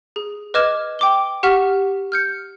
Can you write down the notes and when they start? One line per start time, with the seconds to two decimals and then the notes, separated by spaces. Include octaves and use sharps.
0.16 G#4
0.54 B4 D#5 D6 F6 G#6 E7
0.99 G5 D6 G7
1.43 G4 F#5 C#6 F6 B6 E7
2.12 F6 G6 C#7